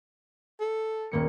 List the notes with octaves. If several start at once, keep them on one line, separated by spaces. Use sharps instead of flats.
A4
D#1 A#3 C#7